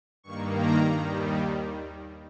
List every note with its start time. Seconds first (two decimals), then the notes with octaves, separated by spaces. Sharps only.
0.24 G2 D#3 A#3 C#6
0.55 A#5
0.88 D#2 D#3 G3